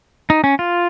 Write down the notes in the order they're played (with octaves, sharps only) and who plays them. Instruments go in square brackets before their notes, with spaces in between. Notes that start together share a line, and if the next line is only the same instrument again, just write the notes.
[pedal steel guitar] D#4
C#4
F4